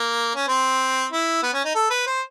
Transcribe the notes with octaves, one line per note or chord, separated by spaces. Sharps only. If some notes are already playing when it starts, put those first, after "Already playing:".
Already playing: A#3
C#4
C4
E4
B3
C#4
D#4
A4
B4
C5